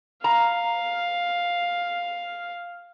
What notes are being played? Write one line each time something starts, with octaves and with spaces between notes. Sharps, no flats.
F5 A#5